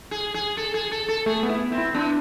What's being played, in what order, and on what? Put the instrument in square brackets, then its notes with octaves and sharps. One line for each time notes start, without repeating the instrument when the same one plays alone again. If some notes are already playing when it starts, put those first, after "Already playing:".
[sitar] G#4
G#4
A4
G#4
A4
A4
[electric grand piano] A3 [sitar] G#4
[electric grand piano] B3
[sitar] E4
C4
[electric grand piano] E4
[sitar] B3 [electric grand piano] D4